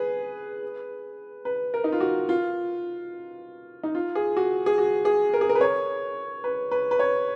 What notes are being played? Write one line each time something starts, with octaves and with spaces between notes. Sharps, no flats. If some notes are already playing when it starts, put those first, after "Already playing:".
Already playing: G#4 B4
B4
A#4
D#4
F4
F#4
F4
D#4
F4
G#4
F#4
G#4
F#4
G#4
A#4
G#4
A#4
B4
C#5
B4
B4
B4
C#5